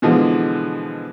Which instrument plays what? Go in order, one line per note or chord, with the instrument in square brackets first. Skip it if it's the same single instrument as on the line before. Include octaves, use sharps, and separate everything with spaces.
[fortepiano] B2 D3 E3 F3 G#3